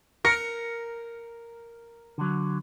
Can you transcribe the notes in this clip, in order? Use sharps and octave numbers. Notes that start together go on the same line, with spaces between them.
A#4 A#6 C#7
D3 F#3